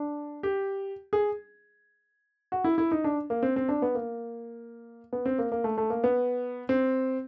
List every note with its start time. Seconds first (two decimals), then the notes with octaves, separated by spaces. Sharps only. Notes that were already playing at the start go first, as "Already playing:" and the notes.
Already playing: D4
0.43 G4
1.13 G#4
2.52 F#4
2.64 E4
2.78 E4
2.91 D#4
3.04 D4
3.30 A#3
3.43 C4
3.56 C4
3.69 D4
3.82 B3
3.95 A#3
5.13 B3
5.26 C4
5.39 A#3
5.52 A#3
5.64 A3
5.78 A3
5.90 A#3
6.04 B3
6.69 C4